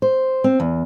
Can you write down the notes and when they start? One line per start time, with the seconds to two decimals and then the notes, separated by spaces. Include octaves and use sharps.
0.02 C5
0.44 C4
0.60 E2